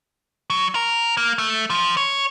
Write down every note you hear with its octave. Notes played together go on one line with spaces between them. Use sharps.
F#3
A#4
A#3
A3
F3
C#5